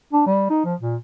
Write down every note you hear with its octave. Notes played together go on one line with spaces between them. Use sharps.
D4
G3
D#4
F3
A#2